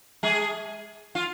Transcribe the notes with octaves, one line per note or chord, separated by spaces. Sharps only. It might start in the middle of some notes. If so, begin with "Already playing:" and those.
G#3 G#4
F4